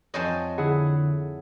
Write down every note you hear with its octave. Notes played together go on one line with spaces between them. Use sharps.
F2 C5 C#5 D#5 G#5 A5
D3 E4 G#4 F#5